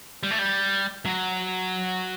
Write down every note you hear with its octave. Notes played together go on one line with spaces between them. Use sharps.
G3
A3
G3
F#3